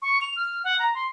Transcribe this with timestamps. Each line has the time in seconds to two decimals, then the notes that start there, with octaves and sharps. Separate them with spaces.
0.02 C#6
0.21 F7
0.36 F6
0.64 F#5
0.79 A#5
0.94 C6